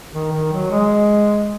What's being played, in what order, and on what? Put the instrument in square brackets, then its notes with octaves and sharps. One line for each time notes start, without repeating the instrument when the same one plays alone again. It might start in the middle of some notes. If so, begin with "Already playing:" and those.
[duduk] D#3
D#3
F#3
G#3